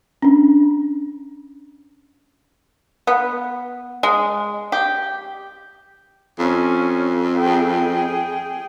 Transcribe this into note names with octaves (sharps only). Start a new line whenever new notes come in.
C#4 D4
B3
G#3
G4
F2 C#4
G#4 G5